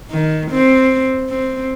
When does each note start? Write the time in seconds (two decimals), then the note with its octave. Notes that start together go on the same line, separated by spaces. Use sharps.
0.11 D#3
0.51 C4
1.30 C4